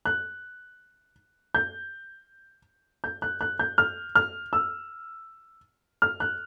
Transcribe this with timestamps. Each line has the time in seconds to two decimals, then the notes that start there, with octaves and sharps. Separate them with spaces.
0.05 F#6
1.55 G6
3.04 G6
3.22 F#6
3.41 F#6
3.59 G6
3.78 F6
4.15 F6
4.53 E6
6.02 F6
6.20 F#6